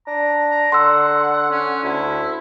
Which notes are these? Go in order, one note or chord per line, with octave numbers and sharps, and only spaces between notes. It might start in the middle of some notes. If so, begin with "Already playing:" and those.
D4 A#5
A#5
D3 F#5 C6 E6
C#4
D2 E4